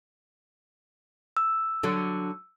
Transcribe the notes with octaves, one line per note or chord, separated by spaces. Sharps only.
E6
D3 F#3